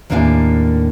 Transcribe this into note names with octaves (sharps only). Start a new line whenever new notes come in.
D#2 A2 A#3 D4 F5 G#5